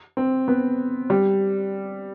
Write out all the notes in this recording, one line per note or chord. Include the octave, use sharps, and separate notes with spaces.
C4
B3
G3